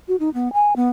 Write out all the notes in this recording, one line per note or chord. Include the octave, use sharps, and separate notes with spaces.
F#4
D#4
B3
G#5
B3